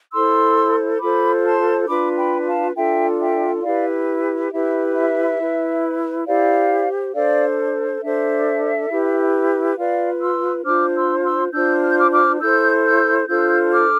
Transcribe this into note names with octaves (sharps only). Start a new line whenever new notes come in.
E4 A4 C5 C6 E6
F4 A4 C5 B5 D6
A5 C6
D4 F4 B4 B5 D6
G5 B5
F5 A5
D4 F4 A4 E5 G5
E5 G5
E4 G4 B4 D5 F5
E4 G4 B4 E5
E5
E4 B4
E4 G4 C5 D5 F5
D4 A4 C5 D5 F5
D4 A4 C5 E5
E4 G4 B4
F4 B4 D5 F5
C6 E6
D4 F4 C5 D6 F6
C6 E6
C6 E6
D4 F4 C5 E6 G6
F6
G6
D6 F6
D6 F6
E4 A4 C5 E6 G6
E6 G6
D4 F4 A4 C5 E6 G6
D6 F6